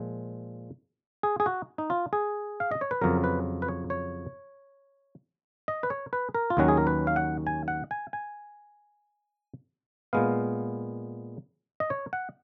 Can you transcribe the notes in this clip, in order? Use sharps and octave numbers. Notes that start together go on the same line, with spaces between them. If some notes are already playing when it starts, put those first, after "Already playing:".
Already playing: A#2 F3 G#3
G#4
G#4
F#4
D#4
F4
G#4
F5
D#5
C#5
B4
F2 C#3 F#3 A#4
B4
B4
C#5
C#5
D#5
B4
C#5
B4
A#4
F4
D#2 D#3 F#3 C#4 F#4
G#4
A#4
B4
F5
F#5
G#5
F#5
G#5
G#5
A#2 G#3 B3 F5
D#5
C#5
F#5